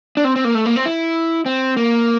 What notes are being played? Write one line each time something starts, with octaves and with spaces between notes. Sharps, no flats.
D4
C4
C4
A#3
A3
A#3
C4
E4
C4
A#3